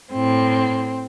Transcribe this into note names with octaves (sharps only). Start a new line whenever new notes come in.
A2 C4